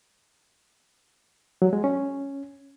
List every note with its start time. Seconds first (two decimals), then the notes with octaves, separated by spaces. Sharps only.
1.62 F#3
1.73 G#3
1.84 C#4